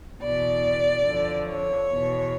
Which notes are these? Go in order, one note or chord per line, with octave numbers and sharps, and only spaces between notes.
E2 B2 D5
F2 D3
C#5
E2 B2